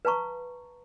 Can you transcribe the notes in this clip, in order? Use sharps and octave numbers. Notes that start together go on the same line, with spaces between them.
B4 F5 A5 A#5 C#6